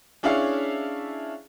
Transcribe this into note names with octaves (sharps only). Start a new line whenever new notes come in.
C#4 D4 E4 G#4 C#5 F5